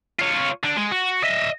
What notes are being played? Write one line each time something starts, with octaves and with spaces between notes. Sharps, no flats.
F4 C#5
D3 D4
G#3
F#4
D#5 E5